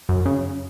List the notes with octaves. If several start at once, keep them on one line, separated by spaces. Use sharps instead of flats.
F#2
C#3